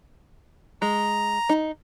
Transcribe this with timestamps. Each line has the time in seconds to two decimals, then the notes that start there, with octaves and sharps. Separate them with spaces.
0.82 G#3 A#5
1.49 D#4